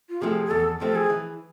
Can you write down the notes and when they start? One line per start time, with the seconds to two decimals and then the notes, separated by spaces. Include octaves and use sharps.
0.10 F4
0.21 C3 F3 A3 C4 G#4
0.46 G#4
0.50 E2 A4
0.80 C3 F3 A3 C4 A4
0.95 G#4
1.10 E3